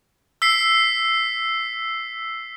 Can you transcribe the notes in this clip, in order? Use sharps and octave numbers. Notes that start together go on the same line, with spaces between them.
E6 B6 C7